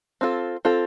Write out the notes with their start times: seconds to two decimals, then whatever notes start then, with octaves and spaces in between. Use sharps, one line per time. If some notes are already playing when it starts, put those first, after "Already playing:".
0.21 C4 F4 A4
0.65 C4 F4 A4